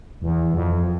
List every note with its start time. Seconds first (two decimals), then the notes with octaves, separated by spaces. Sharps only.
0.22 E2
0.54 F2